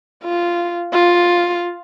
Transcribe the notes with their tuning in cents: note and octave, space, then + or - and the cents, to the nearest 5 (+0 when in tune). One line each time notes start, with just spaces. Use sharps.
F4 -10
F4 +5